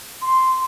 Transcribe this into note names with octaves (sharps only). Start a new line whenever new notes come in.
C6